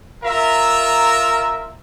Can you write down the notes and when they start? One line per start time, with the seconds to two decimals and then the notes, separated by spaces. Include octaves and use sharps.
0.23 F4 A#4 E5 A#5